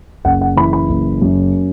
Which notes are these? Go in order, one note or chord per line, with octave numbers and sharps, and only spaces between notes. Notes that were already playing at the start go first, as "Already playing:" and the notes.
F#1 F#5
F#5
E3 B5
B5
F#1
F#2